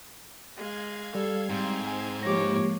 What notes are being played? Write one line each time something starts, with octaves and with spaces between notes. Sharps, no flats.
G#3 F5 G#6
G3 A4
G#2 C4
G#5
F3 G#3 A#3 G4 C#5 D6 A#6